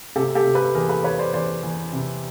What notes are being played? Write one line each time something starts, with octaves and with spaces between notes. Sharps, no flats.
C3 G4 A4
G4 A4
C3
A4 B4
E2 G#4 A#4
A4 B4
E2 B4 C#5
C5 D5
E2 C5 D5
E2
C3